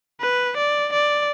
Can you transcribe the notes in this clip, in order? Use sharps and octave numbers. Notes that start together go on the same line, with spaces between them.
B4
D5
D5